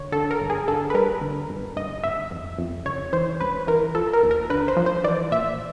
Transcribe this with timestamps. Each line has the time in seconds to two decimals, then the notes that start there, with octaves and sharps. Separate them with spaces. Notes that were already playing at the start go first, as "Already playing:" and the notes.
Already playing: D3 C#5
0.12 D3 A4
0.31 A#4
0.40 G1
0.50 G#4
0.68 D3 A4
0.90 B4
0.94 G3 A#4
1.21 D3
1.50 G1
1.76 G1 D#5
2.04 G1 E5
2.31 F2
2.59 F2
2.86 C#2 C#5
3.13 E3 C5
3.40 C#2 B4
3.67 E3 A#4
3.95 F3 A4
4.13 A#4
4.23 D#2
4.31 A#4
4.50 D3 B4
4.68 C5
4.77 F3
4.86 C5
5.04 E3 D5
5.31 A#1 E5